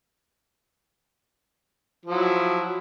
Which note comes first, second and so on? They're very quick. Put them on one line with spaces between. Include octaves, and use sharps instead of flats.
F3 F#3 E4